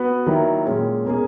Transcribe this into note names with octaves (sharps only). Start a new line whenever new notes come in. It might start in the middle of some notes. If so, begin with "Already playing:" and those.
Already playing: B3 F#4 B4
D#3 F#3 A#3 E4
A#2 G#3 C#4
B2 A#3 C#4 G#4